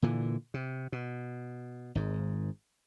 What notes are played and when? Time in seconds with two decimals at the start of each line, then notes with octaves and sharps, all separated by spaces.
0.02 A#2 D3 E3
0.54 C3
0.92 B2
1.95 G#1 G#2